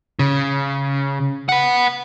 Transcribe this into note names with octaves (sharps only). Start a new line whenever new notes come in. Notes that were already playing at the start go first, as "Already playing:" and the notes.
C#3
B4 F#5